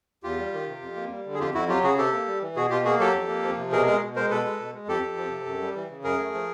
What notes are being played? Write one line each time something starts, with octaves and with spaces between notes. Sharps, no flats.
E2 F4 G4
G3
D#3
C3
F2
A#3
G3
D3
G#4
F2 F4 G4
F2 E4 F#4
F#3 F4 G4
C#3 F#4 G#4
C3 G4 A4
A#3
G3
E3
B2 F#4 G#4
B2 F4 G4
A#3 F#4 G#4
F#3 G4 A4
F2
A#3
F3
C3
B2 G#4 A#4
G#3 G#4 A#4
B2
G#3 A#4 C5
B2 A4 B4
G#3
B2
G#3
F2 G4 A4
F2
F3
C3
F#2
G3
E3
C#3
F#2 G#4 A#4
A3
F3